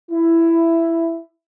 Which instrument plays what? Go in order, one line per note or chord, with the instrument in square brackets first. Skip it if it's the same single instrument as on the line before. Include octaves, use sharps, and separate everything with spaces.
[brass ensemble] E4